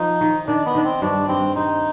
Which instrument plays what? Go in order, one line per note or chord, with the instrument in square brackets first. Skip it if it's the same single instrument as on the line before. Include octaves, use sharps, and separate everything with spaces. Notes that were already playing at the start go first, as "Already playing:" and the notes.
Already playing: [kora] F3 [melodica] D#4
[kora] D#3
[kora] D#3 [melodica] D4
[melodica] B3
[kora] D#3 [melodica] D4
[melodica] C4
[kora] G2 [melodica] D4
[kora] G2 [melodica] C4
[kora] C4 [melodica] D#4